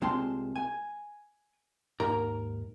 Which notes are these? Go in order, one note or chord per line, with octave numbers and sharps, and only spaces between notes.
C2 G#3 C4 F4 A5 C6
G#5
D#2 G#2 A#4 A#5